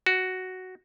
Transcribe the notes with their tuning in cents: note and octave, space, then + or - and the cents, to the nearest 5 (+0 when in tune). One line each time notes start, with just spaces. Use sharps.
F#4 +5